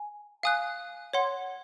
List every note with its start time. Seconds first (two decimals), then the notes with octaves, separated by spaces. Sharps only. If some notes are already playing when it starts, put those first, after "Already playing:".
Already playing: G#5
0.43 F5 G#5 D#6 F#6
1.13 C#5 F#5 C6